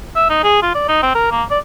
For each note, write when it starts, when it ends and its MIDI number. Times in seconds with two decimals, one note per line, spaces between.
0.16 0.26 76
0.30 0.39 63
0.43 0.62 68
0.62 0.70 65
0.75 0.83 74
0.88 1.01 63
1.03 1.14 60
1.15 1.31 70
1.31 1.43 58
1.50 1.58 74